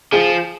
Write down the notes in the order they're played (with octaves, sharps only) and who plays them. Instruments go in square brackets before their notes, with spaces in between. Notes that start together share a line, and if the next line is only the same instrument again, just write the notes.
[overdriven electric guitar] F3 [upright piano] G#4